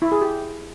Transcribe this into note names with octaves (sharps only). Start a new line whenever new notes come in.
E4
G#4
G4